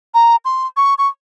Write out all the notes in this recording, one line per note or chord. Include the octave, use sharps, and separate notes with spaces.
A#5
C6
C#6
C#6